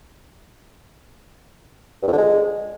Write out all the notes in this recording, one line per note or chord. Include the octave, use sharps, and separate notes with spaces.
G2
F2
D3
G#3